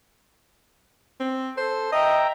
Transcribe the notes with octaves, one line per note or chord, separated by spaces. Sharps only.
C4
A4 C5
D#5 E5 G5 A#5